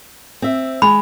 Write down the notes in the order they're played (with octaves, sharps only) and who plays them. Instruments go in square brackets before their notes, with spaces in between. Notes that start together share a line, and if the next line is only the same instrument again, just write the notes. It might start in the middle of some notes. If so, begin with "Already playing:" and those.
[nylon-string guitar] C4 E5
[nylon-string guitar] G#3 [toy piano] B5